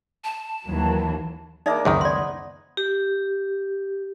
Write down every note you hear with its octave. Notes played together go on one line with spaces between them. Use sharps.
A5
D#2 E3 F#3
G#3 A#3 D4 D#4 D5 E5
C#2 F#2 D#3 D#4 B4 C5
B3 D5 C6
G4